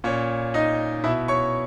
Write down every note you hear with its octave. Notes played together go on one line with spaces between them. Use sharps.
A#2 C#4 C#5
D#4 D#5
B2 E4 E5
C#5 C#6